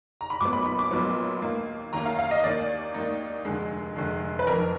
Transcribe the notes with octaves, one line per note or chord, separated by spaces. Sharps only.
A#5
B5
B1 A#2 F#3 B3 D6
B5
B5
D6
B1 A#2 F#3 B3
D#2 D#3 A#3
D#2 D#3 A#3 A#5
F5
F5
D#5
D#2 D#3 A#3 D#4 D5
D#2 D#3 A#3 D#4
F1 D#2 D3 G#3
F1 D#2 D3 G#3
B4
F#1 F2 D#3 A#4